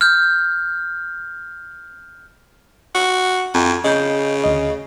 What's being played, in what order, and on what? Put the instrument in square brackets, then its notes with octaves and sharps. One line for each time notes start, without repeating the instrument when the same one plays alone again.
[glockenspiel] F6 G6
[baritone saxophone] F#4
F2
[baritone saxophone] C#3 [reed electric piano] D#5 G6
[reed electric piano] D2 D#5